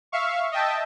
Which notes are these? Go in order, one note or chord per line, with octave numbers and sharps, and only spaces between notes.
E5 F5 C#6
D#5 E5 G5 A5